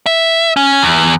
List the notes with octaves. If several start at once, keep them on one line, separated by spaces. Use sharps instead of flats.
E5
C#4
E2